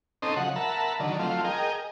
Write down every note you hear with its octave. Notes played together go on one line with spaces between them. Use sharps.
C4 C#4 D#4 A4 C5 D#5
C#3 F3 F#3 F#5
A#4 E5 F#5 A5 B5
D3 D#3 F#3
F3 F#3 A3 C4 F4
G#4 A#4 D#5 G5